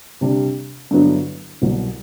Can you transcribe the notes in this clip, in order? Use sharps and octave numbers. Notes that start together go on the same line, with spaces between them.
C3 G3 D4
G2 D3 F#3 B3 E4
C2 B2 F#3